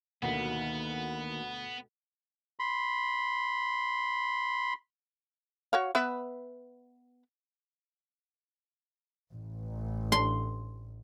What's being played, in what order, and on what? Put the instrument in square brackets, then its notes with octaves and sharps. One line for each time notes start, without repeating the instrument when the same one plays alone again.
[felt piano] D2 B2 B6 [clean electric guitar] D#3 A#3 [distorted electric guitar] B3 [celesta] F#5
[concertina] B5 C6
[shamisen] F#4 C#5 F5
B3 B4 E5
[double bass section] A1
[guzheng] C6